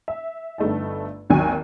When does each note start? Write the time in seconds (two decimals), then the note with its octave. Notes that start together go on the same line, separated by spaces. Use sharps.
0.08 E5
0.58 G1 G2 A3 D#4 A5
1.30 G#1 D#2 F#3 G#5